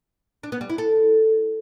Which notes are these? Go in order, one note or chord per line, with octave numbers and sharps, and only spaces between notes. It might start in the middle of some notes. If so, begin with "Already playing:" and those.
D4
B3
G3
E4
A4